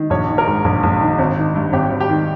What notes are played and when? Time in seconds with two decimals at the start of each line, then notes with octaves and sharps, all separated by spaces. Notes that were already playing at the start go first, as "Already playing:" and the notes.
Already playing: D#3
0.10 A#1 C#5
0.29 D#3
0.38 A#4
0.46 G#2
0.65 A#1
0.83 A#1
1.01 D#3
1.19 G#1
1.37 D#3
1.55 G2
1.73 G#1 G4
1.91 G#1
2.00 G4
2.09 D#3